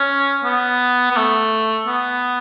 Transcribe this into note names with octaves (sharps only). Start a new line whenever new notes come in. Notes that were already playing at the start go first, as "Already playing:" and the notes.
Already playing: C#4
B3
B3
A3
B3